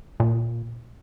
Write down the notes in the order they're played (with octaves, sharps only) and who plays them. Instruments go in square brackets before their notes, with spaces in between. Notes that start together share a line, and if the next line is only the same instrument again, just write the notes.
[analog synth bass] A#2